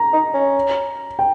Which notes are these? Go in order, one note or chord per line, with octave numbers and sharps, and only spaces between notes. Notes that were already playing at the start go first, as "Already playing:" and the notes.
Already playing: A#5
D#4
C#4
G5